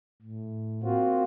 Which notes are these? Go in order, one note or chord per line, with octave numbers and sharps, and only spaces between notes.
A2
A#3 C4 F4 F#4